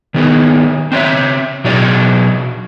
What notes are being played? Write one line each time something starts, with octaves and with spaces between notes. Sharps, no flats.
D#3 B3 G#4
C4 D4 C#5 E5
B2 F#3 G#4 D5